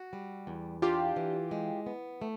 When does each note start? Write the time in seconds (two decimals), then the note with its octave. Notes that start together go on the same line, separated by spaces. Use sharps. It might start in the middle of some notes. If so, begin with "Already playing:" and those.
Already playing: F#4
0.13 G3
0.47 E2
0.82 D4 F4 G4
1.16 E3
1.51 G#3
1.86 B3
2.22 A3